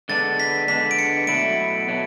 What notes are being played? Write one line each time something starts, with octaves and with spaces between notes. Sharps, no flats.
D3 G#3 B3 D4 A6
B6
D3 G#3 B3 D4 B6
D7
C#7
B2 F#3 A3 E4 D7
B2 F#3 A3